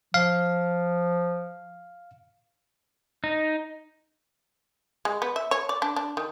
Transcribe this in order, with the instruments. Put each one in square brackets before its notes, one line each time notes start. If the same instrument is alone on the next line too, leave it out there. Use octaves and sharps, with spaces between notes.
[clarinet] F3 [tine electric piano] F5
[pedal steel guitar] D#4
[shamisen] G#3
B3
E5
C#5
D5
D4
D4
D#3